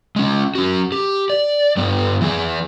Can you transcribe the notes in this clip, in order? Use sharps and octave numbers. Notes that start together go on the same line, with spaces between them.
G#3 C#4
C#4 F#4
G4
D5
G2 G3 B3
E3 G#4